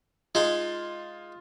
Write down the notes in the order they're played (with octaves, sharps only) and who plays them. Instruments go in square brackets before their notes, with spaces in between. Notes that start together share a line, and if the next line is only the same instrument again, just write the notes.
[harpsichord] G#3 D#4 [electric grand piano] F4